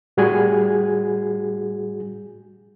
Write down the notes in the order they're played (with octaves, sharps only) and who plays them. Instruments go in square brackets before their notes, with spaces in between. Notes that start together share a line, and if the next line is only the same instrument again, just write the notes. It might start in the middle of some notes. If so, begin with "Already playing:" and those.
[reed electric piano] A2 G3 F#4 G#4 G#5